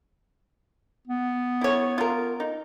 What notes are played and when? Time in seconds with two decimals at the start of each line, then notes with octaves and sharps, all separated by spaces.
1.08 B3
1.61 E4 C#5
1.98 F4 A#4
2.40 D#4